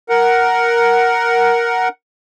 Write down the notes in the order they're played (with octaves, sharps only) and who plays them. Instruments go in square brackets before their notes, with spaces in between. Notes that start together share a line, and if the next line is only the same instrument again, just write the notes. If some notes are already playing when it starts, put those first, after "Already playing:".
[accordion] A#4 F#5